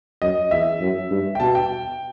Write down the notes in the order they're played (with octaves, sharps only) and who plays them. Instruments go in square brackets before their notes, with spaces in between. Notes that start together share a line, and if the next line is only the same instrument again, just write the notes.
[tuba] F#2 [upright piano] D#5
[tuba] E2 [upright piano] E5
[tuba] F#2
G2
[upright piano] G5
[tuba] B2 [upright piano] A5
[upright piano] G5